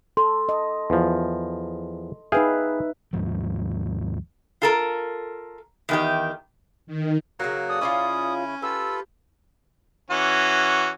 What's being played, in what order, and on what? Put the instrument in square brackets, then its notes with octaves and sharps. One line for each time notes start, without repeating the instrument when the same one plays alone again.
[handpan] A4 [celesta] C6
[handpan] D#5
[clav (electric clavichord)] E2 F3
[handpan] D#4 B4 E5 [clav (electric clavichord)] G#4 F5 G5
[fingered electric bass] D#2 G#2 F3
[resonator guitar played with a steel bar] F4 A4 A#4
E2 D#3 G4
[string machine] D#3
[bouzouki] C#3 A#3 [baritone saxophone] F#3
[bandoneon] A4 D5 [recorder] D#6
[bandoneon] C#3 E4 [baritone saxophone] C#4 [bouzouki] F4 C#5 D5
[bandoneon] F4 A4 B4 [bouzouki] G4 [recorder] E6
[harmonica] E3 C#4 F#4